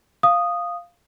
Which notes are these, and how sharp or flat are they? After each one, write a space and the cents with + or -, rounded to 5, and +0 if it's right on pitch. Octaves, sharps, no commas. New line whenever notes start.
F5 +0 D#6 -5